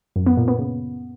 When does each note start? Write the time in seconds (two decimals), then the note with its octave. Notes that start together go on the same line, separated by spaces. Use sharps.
0.16 F#2
0.26 B3
0.37 A#2
0.48 B3
0.59 C#3